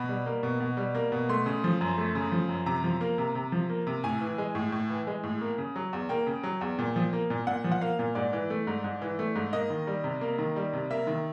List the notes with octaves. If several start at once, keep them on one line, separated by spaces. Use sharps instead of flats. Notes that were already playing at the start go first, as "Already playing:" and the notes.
Already playing: B2 B5
G3
A#3
B2
B2
G3
A#3
B2
A3 C6
C#3
F3
F#2
A3
C#3
F3
F#2
C3 A#5
F3
A#3
C3
C3
F3
A#3
C3
A2 G#5
E3
G#3
A2
A2
E3
G#3
A2
A#3
C#3
F#3
E2
A#3 G5
C#3
F#3
E2
A#2
F3
A#3
A#2
A#2 F#5
F3
F#5
A#3 F5
A#2
G#2 D5
E3
A3
G#2
G#2
E3
A3
G#2
A#3 D#5
D#3
G3
C3
A#3
D#3
G3
C3
A#3 E5
D#3